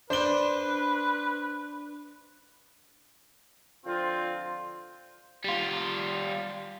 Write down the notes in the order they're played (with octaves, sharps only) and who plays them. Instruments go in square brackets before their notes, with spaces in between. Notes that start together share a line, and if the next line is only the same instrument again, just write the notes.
[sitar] D4 [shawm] B4 [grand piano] C5 G7
[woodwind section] D3 F3 C4 F4
[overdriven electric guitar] G3 F4